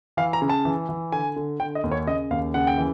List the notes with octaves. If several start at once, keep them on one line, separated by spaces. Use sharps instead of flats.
E3 F5
A#5
C#3
A5
E3
E3
D3 G#5
D3
D3 G5
D#5
D#2
C#5
C#3 D#5
D#2 F5
C#3 F#5
G5
E3